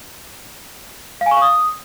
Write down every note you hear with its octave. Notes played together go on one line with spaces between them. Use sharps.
F5
G#5
C#6
F5
D#6